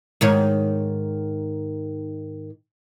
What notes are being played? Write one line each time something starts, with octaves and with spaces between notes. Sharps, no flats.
G#2 D#3 C#5